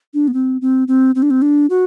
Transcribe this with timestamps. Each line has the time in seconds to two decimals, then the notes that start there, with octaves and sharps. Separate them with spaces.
0.14 D4
0.28 B3
0.34 C4
0.61 C4
0.88 C4
1.15 C4
1.22 D4
1.30 C4
1.42 D4
1.70 F#4